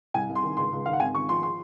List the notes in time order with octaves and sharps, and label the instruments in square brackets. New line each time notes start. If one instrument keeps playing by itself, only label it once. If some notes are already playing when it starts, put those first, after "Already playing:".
[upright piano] C2 G#5
C2
C6
D#3
C#2 C6
C#2
D#3 F5
F#5
G#1 G#5
G#1 C#6
F3 C6
C6